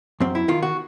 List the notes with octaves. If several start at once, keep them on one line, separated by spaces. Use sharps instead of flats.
F#2 C4
E4
D#3 F4
F#4